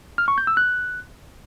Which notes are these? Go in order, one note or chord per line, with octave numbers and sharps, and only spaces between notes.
F6
C#6
G6
E6
F#6